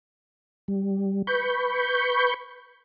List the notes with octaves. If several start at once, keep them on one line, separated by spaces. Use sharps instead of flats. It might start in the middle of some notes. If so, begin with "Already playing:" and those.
G3
B4 B5 C#6 G6